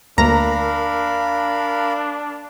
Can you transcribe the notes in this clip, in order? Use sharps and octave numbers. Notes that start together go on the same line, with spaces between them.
D2 A#3 D4 A#4 F5 A#5 B5 A#6